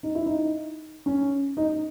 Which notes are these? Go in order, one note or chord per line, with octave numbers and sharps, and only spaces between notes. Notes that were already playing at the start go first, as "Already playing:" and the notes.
D#4
E4
D#4
C#4
D#4